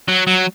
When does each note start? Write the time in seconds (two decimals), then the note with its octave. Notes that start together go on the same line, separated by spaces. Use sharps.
0.08 F#3
0.27 F#3